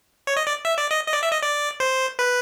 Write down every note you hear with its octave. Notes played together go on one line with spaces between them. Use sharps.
C#5
D#5
D5
E5
D5
D#5
D#5
D5
E5
D#5
D5
C5
B4